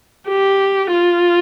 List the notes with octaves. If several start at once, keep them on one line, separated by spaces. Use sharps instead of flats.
G4
F4